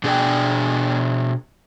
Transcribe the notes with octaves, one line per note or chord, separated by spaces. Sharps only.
B2 D4 G#4 A4 D5 G5